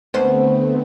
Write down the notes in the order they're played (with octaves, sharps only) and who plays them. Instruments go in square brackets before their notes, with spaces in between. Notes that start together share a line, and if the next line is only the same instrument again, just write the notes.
[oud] D2 C5 [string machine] D3 A3 C4 [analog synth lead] B3